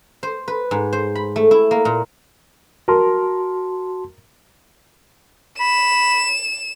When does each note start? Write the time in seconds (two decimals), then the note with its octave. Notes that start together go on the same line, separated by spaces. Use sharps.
0.23 C5
0.48 B4
0.71 G#2
0.93 C5
1.15 B5
1.36 A3
1.51 E4
1.71 A#3
1.85 A#2
2.88 F#4 A#4 A5 C6
5.60 B5 E7